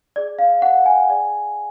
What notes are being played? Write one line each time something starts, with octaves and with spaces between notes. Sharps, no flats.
G#4 D5
F5
F#5
G#5
G#4 D5